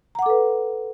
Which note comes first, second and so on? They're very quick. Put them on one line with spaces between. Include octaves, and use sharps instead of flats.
A#5 F#5 D6 A4 B4